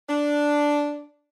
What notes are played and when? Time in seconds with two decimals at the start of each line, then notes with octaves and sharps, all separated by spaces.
0.09 D4